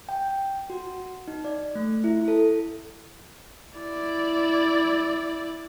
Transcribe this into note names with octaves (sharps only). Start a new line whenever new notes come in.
G5
F#4
D#4
D5
A3
E4
A4
E4 D5